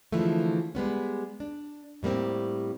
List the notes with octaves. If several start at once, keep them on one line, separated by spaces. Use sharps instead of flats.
D3 E3 F3 G#3 A3
G3 G#3 B3 C#4
D4
A2 G3 A#3 C4